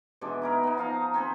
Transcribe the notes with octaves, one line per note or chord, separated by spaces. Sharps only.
B2 E3 G#3 D4
D#4 E4 A#4
B3 D#4
F3 F5 A#5
C4 G#4 B4 C5